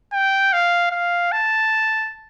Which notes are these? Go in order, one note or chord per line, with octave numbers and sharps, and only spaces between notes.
G5
F5
F5
A5